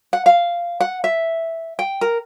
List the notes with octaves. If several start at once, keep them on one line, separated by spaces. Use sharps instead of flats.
F#5
F5
F#5
E5
G5
A#4